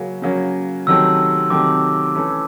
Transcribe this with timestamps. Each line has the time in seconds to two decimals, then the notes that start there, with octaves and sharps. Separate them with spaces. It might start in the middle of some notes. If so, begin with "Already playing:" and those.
Already playing: C#3 F#3 A#3 C#4
0.22 C#3 F#3 A#3 C#4
0.87 C3 D#3 F#3 A3 C4 E6
1.50 C3 D#3 F#3 A3 C4 D6
2.15 E3 A3 C#4